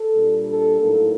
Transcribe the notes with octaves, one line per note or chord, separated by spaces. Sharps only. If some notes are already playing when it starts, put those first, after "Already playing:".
Already playing: A4
A#2 G3 D4
A4
A2 F#3 A#3 D#4 A4